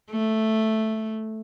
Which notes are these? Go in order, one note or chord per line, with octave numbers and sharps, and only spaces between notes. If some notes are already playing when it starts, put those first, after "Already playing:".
A3